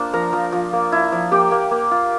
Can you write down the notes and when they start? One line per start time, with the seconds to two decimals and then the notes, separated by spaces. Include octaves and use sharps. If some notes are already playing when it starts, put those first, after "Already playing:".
Already playing: A#3 D4 F4 C5
0.13 F3 A#4 A#5
0.33 F3
0.52 F3
0.73 A#3
0.92 E4
1.12 F3
1.31 A#3 G4 G5
1.51 A#3
1.71 A#3
1.91 F4